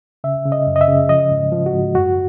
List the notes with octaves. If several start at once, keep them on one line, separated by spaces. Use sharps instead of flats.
C#3 E5
C#3
D#5
F#2
D#5
E5
C#3
F3 D#5
G#2
F3
F#4
G#2
F#2 F#4